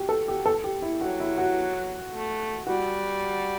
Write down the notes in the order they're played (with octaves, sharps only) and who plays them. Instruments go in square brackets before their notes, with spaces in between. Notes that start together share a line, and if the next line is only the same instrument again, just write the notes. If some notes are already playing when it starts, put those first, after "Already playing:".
Already playing: [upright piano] F#4 G4
A4
G4
A4
G4
E4
[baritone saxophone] F#3 [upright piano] F#4
[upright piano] E4
F#4
[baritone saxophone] A3
[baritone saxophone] G3 [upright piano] F#4